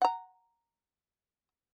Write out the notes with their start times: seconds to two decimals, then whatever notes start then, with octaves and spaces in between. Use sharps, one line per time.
0.02 F#5 A#5